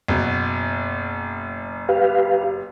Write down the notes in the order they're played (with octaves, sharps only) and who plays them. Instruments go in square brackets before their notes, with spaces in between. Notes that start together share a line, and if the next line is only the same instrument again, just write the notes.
[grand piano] F#1 B2
[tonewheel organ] G4 B4 F5